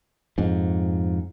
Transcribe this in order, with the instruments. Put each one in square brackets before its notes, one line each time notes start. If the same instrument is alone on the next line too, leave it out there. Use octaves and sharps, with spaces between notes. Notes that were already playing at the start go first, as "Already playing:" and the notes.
[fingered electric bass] F2 G#2